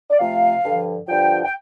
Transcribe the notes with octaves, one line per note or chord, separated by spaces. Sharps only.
D5
C3 F3 A3 F5
G2 D3 F3
G2 D3 F3 G5
G5